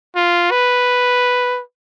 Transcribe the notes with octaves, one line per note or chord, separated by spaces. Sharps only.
F4
B4